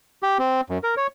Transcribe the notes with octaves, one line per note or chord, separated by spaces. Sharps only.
G4
C4
F#2
A#4
C#5